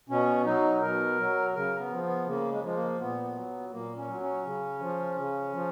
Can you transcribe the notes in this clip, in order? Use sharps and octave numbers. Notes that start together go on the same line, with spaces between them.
B2 C#4
F#3 D#4
B2 A#4
F#3
C#3 A#4
B3
F3
B3
C#3 A#3
G#3
F3 G#3
A#3
A#2 B3
F#3
A#2 A#3
C#4
F#3
C#4
C#3
F3
C#3
F3